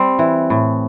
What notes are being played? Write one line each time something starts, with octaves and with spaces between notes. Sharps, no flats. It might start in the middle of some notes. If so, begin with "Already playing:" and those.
Already playing: G3 C4
E3
A2